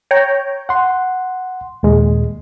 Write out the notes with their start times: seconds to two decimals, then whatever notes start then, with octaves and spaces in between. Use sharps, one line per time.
0.11 C#5 G5 A#5
0.69 F#5 C6
1.83 D#2 A#2 G#3